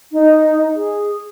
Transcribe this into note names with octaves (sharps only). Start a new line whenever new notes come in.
D#4
G#4